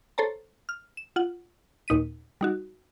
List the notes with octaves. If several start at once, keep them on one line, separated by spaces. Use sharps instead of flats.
A4 C5 C#5 A5 A#5
F6
E7
F4 F#5
D#2 A#2 D#4 B6 D#7
G3 D#4 F#4